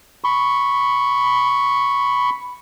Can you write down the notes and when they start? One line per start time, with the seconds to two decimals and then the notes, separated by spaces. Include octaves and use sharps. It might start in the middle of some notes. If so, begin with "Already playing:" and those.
0.24 B5 C#6